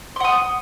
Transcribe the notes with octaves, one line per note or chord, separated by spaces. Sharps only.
F#5 C6 D#6